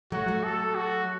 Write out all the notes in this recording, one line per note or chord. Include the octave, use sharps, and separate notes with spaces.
F#3 A3 F#4
F#3 A3
A4
F#4